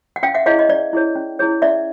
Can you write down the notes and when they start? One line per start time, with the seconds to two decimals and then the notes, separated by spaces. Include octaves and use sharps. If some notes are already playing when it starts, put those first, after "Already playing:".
0.16 F#5
0.23 C#4 F5 G5
0.35 E5 F#5
0.46 E4 G#4 C#5 D#5 F5
0.59 D#5
0.69 C#4 D5
0.93 E4 G#4 C#5
1.15 C#4
1.39 E4 G#4 C#5
1.62 C#4 D5 E5